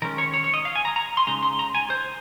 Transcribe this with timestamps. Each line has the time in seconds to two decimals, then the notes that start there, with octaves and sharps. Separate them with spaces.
0.02 D#3 G#3 C#4 A#4
0.18 C#5
0.34 C#5
0.44 C#5
0.54 D#5
0.65 F5
0.76 G#5
0.85 A#5
0.96 A#5
1.17 C6
1.27 C#3 G#3 D#4 A#5
1.43 C6
1.59 A#5
1.75 G#5
1.90 C5